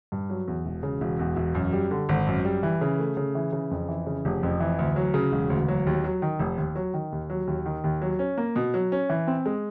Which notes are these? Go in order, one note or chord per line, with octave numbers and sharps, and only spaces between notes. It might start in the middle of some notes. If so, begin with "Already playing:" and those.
G2
F#3
E2
E1
C#3
E1
E2
E1
F#2
G3
D3
G#1
F#2
G3
E3
C#3
A3
C#3
E3
C#3
F2
E3
C#3
F1
F2
E3
D2
F#3
C#3
E1
D2
F#3
D#2
F#3
D#3
F1
D#2
F#3
D#3
D#2
F#3
D#2
D#3
D#2
F#3
C#4
A#3
B2
F#3
C#4
E3
C4
G#3